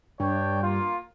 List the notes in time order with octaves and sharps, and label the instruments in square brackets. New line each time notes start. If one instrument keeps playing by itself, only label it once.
[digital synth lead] G2 [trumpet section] D4 C#5 G5
[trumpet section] A#3 F4